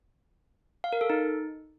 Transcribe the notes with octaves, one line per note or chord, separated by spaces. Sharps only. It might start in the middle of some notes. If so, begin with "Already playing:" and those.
F5
A#4
A4
D#4